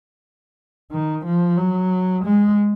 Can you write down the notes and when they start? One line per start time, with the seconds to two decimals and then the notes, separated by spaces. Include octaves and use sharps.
0.92 D#3
1.25 F3
1.58 F#3
2.24 G#3